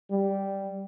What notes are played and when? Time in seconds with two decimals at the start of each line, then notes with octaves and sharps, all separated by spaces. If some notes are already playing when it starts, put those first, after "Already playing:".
0.10 G3